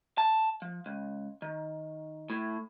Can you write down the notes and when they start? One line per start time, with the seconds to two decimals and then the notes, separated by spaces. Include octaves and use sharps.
0.18 A5
0.62 F3
0.86 C#2
1.42 D#3
2.30 A2